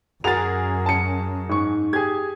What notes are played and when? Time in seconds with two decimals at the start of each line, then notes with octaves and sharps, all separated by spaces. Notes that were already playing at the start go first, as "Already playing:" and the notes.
0.24 F#2 F#4 G#4 A#4 A6 F7
0.86 A5 C#7
1.49 G#2 C#6
1.93 G4 G#4 G#6